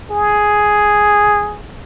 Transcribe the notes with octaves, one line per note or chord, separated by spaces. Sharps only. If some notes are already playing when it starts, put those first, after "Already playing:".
G#4